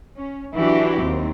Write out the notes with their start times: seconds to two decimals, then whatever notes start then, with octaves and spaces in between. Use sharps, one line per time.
0.16 C#4
0.55 E3 F#3 D4 E4 F#4 G4
1.01 D#2 C4